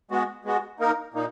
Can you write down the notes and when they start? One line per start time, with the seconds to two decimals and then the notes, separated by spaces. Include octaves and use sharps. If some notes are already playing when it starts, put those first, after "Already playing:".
0.11 G#3 B3 F#4
0.45 G#3 B3 F#4
0.79 A#3 D#4 A#4
1.14 A#2 A#3 D#4